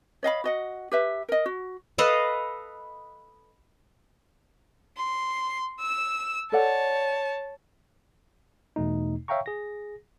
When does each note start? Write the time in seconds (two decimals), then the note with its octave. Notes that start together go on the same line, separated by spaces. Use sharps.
0.23 C#5 D#5 F5 B5
0.44 F#4 D#5 F#5
0.91 G4 B4 E5
1.29 A#4 D#5
1.46 F#4
1.98 A4 B4 D#5 F5
4.97 C6
5.80 E6 E7
6.52 A4 C#5 D5 F#5 A5
8.76 E2 B2 A3 D#4
9.28 C#5 E5 F5 G5 A#5 C#6
9.46 G#4 A#6